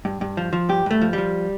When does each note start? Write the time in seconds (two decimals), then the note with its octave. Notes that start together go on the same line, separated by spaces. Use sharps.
0.05 G2
0.21 G2
0.37 F3
0.53 F3
0.69 G2 G4
0.86 G2 A3
1.02 F3
1.13 F3 G3